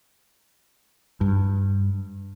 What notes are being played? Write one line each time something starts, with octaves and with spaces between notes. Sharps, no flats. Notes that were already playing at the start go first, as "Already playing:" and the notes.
G2